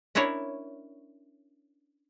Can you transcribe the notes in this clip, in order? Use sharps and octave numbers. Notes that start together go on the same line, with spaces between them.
C#4 D4 E4 A#4 C#5